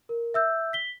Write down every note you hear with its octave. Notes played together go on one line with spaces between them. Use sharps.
A#4
E5 E6 G6
B6 G7